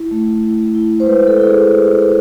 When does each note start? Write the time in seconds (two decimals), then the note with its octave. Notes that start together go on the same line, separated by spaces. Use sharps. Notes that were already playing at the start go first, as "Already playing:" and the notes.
Already playing: E4
0.11 A3
0.43 E4
0.75 E4
1.00 C5
1.06 G#3 B4
1.28 A4
1.38 E4 A4
1.49 G#4